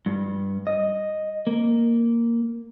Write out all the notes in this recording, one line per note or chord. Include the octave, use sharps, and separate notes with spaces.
G2
D#5
A#3